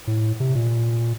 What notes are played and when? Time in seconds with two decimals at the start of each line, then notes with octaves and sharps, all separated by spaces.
0.07 A2
0.40 C3
0.55 A#2